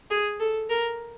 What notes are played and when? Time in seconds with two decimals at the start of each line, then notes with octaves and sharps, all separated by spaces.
0.10 G#4
0.40 A4
0.70 A#4